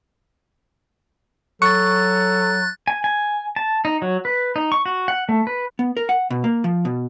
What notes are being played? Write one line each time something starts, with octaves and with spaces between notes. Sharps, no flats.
F#3 A4 C#6 F#6 A6
G#5
G#5
A5
D#4
F#3
B4
D#4
C#6
F#4
F#5
A3
B4
B3
A#4
F#5
B2
A#3
F3
B2